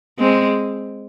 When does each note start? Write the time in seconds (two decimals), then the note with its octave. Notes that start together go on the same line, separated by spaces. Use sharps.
0.19 G#3 C4